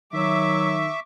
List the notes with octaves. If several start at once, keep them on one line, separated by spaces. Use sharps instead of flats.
D#3 F#3 E5 C#6 D6